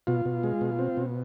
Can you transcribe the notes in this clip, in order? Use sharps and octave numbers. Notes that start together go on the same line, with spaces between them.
B2 F4
B2
G#3
B2
C4
B2